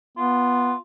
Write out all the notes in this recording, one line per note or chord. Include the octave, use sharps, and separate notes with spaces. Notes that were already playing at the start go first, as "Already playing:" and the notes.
B3 F4